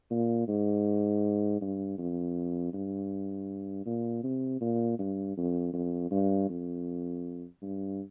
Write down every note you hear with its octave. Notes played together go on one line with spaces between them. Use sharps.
A#2
G#2
G2
F2
G2
A#2
C3
A#2
G2
F2
F2
G2
F2
G2